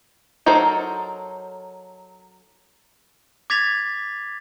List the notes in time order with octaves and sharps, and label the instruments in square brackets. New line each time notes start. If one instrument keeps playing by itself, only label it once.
[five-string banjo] F#3 D#4 A4 A#4 C5
[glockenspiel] D6 G#6 A6 B6 F7